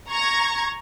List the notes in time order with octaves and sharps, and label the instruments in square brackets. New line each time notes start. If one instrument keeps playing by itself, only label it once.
[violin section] A#5 C#6 G#6